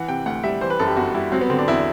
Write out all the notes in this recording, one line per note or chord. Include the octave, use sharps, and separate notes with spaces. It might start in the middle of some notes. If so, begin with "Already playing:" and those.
Already playing: E3 F#5
C3 G5
D2 F#5
G3 E5
E3 C5
B4
F#2 A4
G4
G1 F#4
G3 E4
F#3 C4
B3
D3 C4
D4
E2 E4